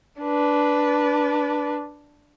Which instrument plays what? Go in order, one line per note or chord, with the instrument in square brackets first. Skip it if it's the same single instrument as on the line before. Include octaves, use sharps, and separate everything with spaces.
[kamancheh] D4 B4